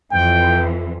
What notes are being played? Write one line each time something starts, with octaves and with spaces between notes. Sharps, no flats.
F2 E3 G5